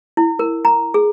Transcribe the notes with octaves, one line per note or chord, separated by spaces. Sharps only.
E4
A#4
A#5
G#4